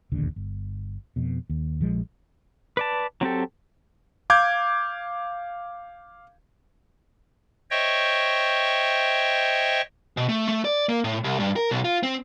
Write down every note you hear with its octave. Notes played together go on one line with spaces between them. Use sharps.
E1 A#1 D#2 D3
G1
F2 B2
D#2
A#1 F3 G#3
B4 D5 A5
F#3 C4 G4 A4
F5 D6 G6 G#6
C5 C#5 D#5 E5 G5 C#6
B2
A3
A3
D5
A#3
A2
C2
G2
A#4
B1
F4
C4